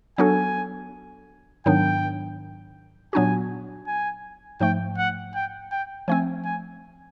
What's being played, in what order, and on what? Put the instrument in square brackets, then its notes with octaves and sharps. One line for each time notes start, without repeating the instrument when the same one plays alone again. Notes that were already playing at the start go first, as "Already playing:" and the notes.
[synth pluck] F#3 B3 D4 F#4 A4 [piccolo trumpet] G#5
[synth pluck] G#2 D#3 F#3 B3 D4 [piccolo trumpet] G5
[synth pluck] A#2 F#3 B3 D4 F#4 [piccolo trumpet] G#5
[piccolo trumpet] G#5
[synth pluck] G#2 F3 A3 [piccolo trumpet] G5
[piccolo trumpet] F#5
G5
G5
[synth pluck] F3 A3 C4 [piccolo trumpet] G#5
[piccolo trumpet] G#5